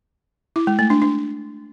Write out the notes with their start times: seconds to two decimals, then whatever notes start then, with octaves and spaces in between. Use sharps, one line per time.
0.56 E4
0.67 G#3
0.79 A3
0.90 D4
1.02 D4